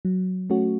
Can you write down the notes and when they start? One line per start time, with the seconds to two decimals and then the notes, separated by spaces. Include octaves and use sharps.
0.05 F#3
0.50 A3 C#4 F#4